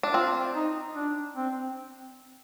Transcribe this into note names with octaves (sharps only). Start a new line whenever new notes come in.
D4
C4 F4
D#4
D4
C4